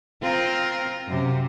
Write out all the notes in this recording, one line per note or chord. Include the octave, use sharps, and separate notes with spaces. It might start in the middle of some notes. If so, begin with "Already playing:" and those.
C4 F4 A#4
F#2 C3